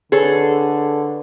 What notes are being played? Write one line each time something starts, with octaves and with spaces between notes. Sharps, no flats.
D3 G#4 A4 B4 C#5